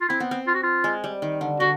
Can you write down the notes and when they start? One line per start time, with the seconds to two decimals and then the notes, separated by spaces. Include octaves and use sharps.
0.01 F4
0.09 C4 E4
0.20 B3
0.31 C4
0.47 F4
0.54 F#4
0.63 F4
0.84 G#3
1.04 G3
1.22 D#3
1.41 D3
1.60 D3 F#4